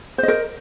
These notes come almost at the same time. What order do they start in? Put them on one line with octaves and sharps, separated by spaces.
C5 D#5 A#4